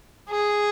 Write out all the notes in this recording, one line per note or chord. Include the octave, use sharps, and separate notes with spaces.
G#4